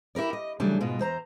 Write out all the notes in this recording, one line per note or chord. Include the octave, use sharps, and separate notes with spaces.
E4 G4 A#4 D5
D#5
C#3 E3 F#3 G3 A3 D4
G#2 B2 G#3 F4
E2 C5 A#5